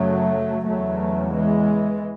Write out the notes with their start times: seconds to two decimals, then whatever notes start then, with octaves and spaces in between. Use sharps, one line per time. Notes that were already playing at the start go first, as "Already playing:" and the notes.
Already playing: F#2 C#3 F#3 A3
0.65 E2 C#3 F#3 A3
1.32 E3 G#3